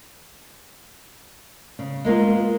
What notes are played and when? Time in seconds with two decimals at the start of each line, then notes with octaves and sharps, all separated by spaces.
1.79 C#3
2.05 G#3 A#3 B3 F4